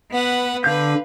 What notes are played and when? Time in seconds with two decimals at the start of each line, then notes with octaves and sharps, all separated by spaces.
0.12 B3 B4 F#5
0.64 D3 B4 F5 G6